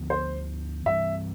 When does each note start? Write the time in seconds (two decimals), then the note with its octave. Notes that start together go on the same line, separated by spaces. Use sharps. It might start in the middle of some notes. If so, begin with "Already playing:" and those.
Already playing: D2 D3 F3 B3
0.10 C5
0.86 G2 E3 G3 C4 E5